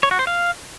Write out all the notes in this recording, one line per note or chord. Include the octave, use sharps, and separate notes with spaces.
C#5
F#4
C5
F5